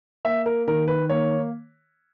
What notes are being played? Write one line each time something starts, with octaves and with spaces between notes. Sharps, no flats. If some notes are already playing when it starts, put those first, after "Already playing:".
A#3 E5
A#4
D#3 A#4
B4
A#3 C#5